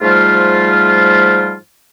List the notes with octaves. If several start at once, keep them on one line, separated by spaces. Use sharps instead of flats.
G#2 F3 G3 A3 F4